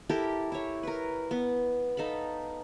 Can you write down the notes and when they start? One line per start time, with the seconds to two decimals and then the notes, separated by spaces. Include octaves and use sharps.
0.09 E4 G4 A4 A#4
0.52 E4 C#5
0.83 A#4 B4
1.31 B3
1.97 D#4 A4 F5 B5